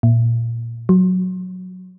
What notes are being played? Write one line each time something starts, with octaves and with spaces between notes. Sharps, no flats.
A#2
F#3